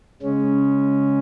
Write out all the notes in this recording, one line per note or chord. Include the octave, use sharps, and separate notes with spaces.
C#3 G#3 C#4